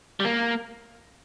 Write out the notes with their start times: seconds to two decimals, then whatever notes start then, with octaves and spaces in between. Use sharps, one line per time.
0.20 G3
0.25 A#3